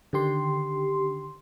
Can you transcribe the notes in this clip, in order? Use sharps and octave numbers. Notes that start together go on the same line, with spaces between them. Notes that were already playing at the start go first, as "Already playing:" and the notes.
D3 D#3 G4 C6